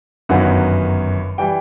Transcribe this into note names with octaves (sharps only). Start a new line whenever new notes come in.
G1 F#2 D#3 F#3 B3 F#5
E3 G3 G5